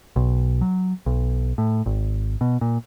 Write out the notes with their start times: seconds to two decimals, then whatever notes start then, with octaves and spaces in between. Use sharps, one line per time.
0.16 B1
0.61 F#3
1.06 B1
1.58 A2
1.86 G#1
2.41 B2
2.61 A#2